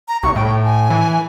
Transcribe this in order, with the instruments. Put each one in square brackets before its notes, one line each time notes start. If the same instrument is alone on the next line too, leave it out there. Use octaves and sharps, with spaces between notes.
[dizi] A#5
[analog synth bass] C2 [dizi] C#6
[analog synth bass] A2 [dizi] G5
[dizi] G#5
[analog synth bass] E3